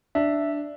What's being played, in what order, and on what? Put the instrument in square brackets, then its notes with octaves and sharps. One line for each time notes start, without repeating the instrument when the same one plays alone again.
[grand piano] D4 [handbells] E5